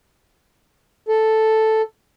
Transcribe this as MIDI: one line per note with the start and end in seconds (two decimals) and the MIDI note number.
1.08 1.82 69